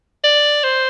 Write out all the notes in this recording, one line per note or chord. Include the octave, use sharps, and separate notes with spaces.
D5
C5